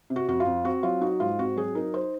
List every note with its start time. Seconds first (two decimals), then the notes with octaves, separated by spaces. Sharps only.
0.10 C3
0.16 F#4
0.28 F2 F#4
0.40 F4
0.46 F2
0.64 C4 F#4
0.83 F#3 F4
1.01 D#4 F#4
1.20 G#2 F4
1.39 C4 F#4
1.57 F#3 G#4
1.75 D#4 A#4
1.94 C5